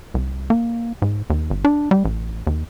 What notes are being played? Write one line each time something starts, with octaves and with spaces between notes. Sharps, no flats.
C2
A#3
G#2
D#2
G1
D4
G3
A1
D#2